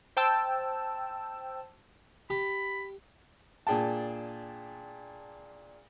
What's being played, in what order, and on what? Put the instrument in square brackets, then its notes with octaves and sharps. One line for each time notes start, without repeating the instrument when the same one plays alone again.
[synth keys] C5 G5 A5 E6
[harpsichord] G4 [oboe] B5
[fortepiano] A#2 D4 G#4 G5 A5